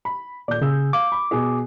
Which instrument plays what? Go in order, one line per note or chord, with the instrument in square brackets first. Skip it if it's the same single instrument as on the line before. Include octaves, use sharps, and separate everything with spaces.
[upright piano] B5
[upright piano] D#1 G6 [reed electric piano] D5
[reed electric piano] C#3 [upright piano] G#4 E6
[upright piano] F5 [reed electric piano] D6
[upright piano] B5
B2 G#4